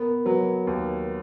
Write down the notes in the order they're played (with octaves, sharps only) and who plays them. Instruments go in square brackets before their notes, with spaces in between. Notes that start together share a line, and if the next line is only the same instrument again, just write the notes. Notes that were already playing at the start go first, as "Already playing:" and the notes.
Already playing: [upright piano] B3 [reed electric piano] A#4
[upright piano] F#3 [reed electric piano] B4
[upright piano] D#2